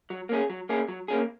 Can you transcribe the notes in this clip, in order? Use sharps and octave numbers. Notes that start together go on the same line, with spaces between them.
F#3
A#3 C#4 G#4
F#3
A#3 C#4 G#4
F#3
A#3 C#4 G#4